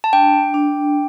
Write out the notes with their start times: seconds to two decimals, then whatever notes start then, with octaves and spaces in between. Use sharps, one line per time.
0.04 A5
0.13 D4 G5
0.54 D4